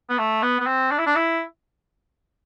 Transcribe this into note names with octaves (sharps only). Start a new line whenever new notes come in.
B3
A3
B3
B3
C4
D4
E4
D4
E4